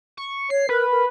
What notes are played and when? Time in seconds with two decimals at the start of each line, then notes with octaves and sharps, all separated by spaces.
0.17 C#6
0.50 C#5 C7
0.69 A#4 B4
0.92 A#4